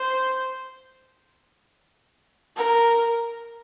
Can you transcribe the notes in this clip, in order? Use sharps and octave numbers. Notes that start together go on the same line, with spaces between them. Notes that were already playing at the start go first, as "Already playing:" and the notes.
Already playing: C5
A#4